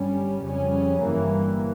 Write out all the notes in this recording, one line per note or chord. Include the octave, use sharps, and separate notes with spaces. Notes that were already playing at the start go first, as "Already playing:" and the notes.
Already playing: G1 G2 G3 C#4
F2 C#3 G3 C#4
G1 G2 E3 G3 A#3